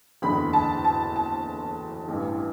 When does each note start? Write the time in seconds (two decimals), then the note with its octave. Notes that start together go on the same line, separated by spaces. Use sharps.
0.22 F#1 E2 D3 B5
0.53 A5
0.84 A5
1.16 A5
2.08 A1 G2 E3